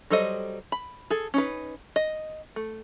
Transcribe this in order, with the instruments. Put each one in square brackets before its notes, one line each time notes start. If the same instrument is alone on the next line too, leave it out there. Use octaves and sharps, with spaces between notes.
[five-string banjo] F#3 G3 A4 C5 D#5
B5
G#4 A4
C#4 D#4 B4
D#5
A3